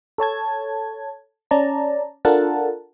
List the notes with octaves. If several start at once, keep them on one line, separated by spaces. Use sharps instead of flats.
A4 C#5 A5 G#6
C#4 D5 A5 A#5
D4 F4 A4 A#4 F#5 A5